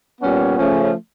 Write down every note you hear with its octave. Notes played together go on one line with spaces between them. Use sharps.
A#2 G3 B3 C#4
C#3 F3 A3 C#4